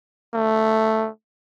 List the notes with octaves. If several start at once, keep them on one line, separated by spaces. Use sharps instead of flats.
A3